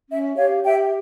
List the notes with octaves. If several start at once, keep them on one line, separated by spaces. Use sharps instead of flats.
C#4 E5
G4 C#5 F5
G4 E5 G5